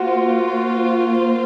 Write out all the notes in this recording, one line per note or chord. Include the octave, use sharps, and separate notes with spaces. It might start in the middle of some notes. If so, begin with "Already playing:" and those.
Already playing: A#3 F4 F#4 C5